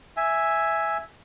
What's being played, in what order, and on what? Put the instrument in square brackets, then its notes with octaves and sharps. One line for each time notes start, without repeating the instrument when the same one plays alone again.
[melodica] E5 G#5